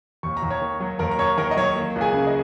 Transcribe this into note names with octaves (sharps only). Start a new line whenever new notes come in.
D#2 C#6
A#5
D#2
C#5 C#6
D#3
F#3
D#2 A#4 A#5
A#5
D#2 C#5 C#6
D#3 A#4 A#5
D#5
F#3 C#5
A#3
C#2
G#4 G#5
C#3
D#5